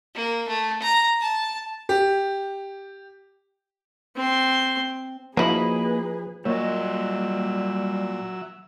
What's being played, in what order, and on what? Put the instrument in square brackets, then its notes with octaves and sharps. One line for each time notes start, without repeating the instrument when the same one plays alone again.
[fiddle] A#3
A3
A#5
A5
[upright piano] G4
[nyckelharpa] C4 C6
[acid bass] F3 [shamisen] F#3 E4 [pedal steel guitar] A#3 D#5 B5 [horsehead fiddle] G#4 B4
[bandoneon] A#2 [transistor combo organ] F#3 E5 [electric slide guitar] G3 D#5 [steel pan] A#3 C#5